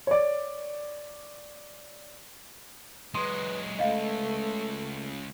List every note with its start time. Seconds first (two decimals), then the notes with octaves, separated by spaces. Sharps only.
0.07 C#5 D5
3.15 F#3 G#3 B4 C6 D#6
3.79 C#2 A3 D#5 F5